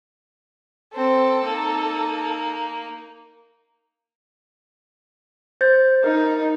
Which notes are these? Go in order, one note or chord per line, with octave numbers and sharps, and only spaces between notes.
C4 A4
A#3 D#4
C5 G6 A6
D#4 A#4